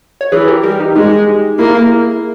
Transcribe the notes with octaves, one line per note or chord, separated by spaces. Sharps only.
C#5
E3 G#4 B4
G4 A#4
G3 G4 A#4
D#4 G4
G#3 D#4 G4
A#3 E4 G#4